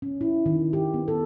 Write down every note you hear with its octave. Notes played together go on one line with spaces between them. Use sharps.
C#4
E4
D#3
G4
B3
A4